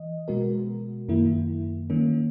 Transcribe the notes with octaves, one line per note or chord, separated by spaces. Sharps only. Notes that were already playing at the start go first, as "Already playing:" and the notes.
Already playing: E3 D#5
B2 G#3 B3 F#4 A#4
F#2 D#3 A#3 E4
D#3 A#3 C#4